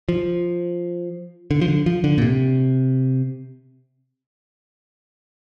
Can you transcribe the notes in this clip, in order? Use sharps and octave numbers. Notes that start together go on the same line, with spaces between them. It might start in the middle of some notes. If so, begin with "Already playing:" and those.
F3
D3
F3
D3
F3
D3
A#2
C3